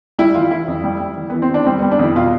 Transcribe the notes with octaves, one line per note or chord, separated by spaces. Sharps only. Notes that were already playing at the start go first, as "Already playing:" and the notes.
G3 E4
E3 F4
E3 E4
F2
G3
G3
E3
E3 B3
C4
E3 D4
G3 C4
G3 B3
D4
F2 E4
B2 F4